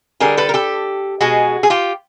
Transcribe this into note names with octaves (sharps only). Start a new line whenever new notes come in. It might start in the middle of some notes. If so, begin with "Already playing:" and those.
D3 G3 G#4 A#4
A4 B4
A#4
G4 A4
B2 G#3 F#4 G#4
G#4
F4 G4